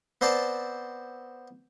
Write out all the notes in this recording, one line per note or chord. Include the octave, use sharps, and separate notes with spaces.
B3 C4 C5 D5 A5